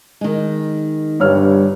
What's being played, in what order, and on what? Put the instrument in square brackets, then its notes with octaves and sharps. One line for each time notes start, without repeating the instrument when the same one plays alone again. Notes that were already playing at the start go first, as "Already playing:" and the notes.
[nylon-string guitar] D#3 G#3
[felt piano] G1 C#5 F6 [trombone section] G2